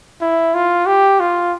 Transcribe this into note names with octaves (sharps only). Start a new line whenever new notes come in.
E4
F4
G4
F4